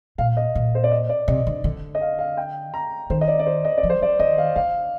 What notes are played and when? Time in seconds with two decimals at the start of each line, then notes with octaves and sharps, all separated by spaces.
0.18 A#2 F5
0.37 D#5
0.55 A#2
0.75 C5
0.84 D5
0.92 D#5
1.09 D5
1.28 C3 D#5
1.47 D3
1.64 D3
1.95 D#5
2.01 F5
2.19 F5
2.37 G5
2.74 A#5
3.10 D#3 C5
3.21 D#5
3.28 D5
3.39 D5
3.46 C5
3.65 D#5
3.78 D5
3.83 F3
3.90 C5
4.01 F3 D5
4.19 D#3 D#5
4.38 F5
4.56 D3 F5